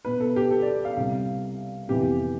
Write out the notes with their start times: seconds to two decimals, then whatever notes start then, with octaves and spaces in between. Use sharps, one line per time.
0.05 B2 B3 B4
0.20 A4
0.36 G4
0.50 A4
0.62 D5
0.85 F5
0.97 C2 C3 G3 F5
1.88 F2 C3 E3 B3 G4